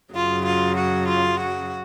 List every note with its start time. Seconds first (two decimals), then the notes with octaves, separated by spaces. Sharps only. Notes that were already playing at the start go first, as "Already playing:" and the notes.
0.14 F#2 C#3 F#3 F4
0.45 F4
0.77 F#4
1.08 F4
1.40 F#4